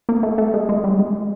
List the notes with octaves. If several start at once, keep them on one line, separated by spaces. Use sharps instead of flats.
A#3
A3
A3
G#3
G#3
G3
G#3